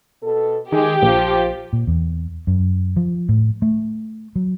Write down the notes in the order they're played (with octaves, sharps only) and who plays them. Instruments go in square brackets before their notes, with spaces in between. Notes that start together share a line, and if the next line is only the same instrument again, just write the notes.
[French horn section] B2 A4
[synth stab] D#3 [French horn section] G#3 G#4 [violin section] G4
[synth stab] A#1 [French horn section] F3
[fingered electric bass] A#2
E2
F#2
F3
A2
A3
F#3